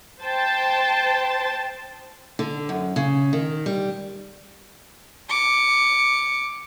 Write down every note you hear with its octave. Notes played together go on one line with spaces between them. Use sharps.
C5 G5 A5
D3
F#2
C#3
D#3
G3
D6 C#7